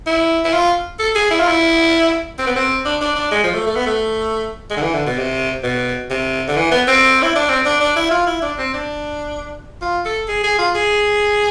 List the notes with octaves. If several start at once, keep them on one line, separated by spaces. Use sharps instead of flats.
E4
E4
F4
A4
G#4
E4
F4
E4
C4
B3
C4
D4
D4
D4
G#3
F3
A3
A3
B3
A3
G#3
D3
E3
D3
B2
C3
B2
C3
D3
E3
B3
C4
E4
D4
C4
D4
D4
E4
F4
E4
D4
C4
D4
F4
A4
G#4
G#4
F4
G#4